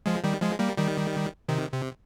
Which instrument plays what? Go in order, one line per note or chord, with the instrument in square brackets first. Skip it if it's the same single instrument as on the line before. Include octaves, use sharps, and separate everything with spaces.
[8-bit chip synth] F3 G#3
D#3 G3
F3 G#3
G3 A#3
D#3 G3
C3 D#3
C3